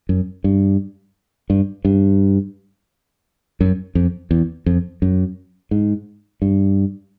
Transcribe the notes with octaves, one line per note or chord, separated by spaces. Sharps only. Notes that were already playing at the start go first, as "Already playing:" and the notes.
F#2
G2
G2
G2
F#2
F2
E2
F2
F#2
G#2
G2